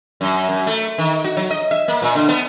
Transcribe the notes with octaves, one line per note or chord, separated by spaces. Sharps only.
F#2
F#2
A3
D#3
F#4
F#3
D#5
E5
A#3
A#2
D3
B3